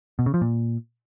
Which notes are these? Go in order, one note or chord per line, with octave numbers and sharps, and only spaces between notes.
B2
C#3
F3
A#2